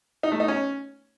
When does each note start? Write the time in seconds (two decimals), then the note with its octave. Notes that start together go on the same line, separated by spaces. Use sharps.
0.23 D#4
0.32 A3
0.40 D#4
0.48 C#4